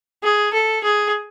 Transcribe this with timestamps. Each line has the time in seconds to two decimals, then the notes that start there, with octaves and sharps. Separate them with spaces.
0.24 G#4
0.53 A4
0.83 G#4